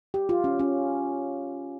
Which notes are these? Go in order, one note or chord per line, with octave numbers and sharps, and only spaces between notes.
G4
F4
C#4
C#4